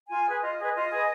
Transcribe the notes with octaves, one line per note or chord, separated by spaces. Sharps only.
F4 G#5
G#4 B4
F4 D#5
G#4 B4
F4 D#5
G#4 B4